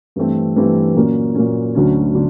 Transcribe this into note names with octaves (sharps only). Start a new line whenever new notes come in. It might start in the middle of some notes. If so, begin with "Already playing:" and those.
G2 E3 A3 C4
G2 E3 A3 C4
A#2 F#3 A#3 C#4
A#2 F#3 A#3 C#4
D2 D3 F#3 A3 C#4
D3 F#3